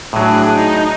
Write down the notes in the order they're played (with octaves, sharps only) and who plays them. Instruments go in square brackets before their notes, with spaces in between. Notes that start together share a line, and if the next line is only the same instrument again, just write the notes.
[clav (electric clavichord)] A2 F#3 [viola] D4 G#4
[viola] D#4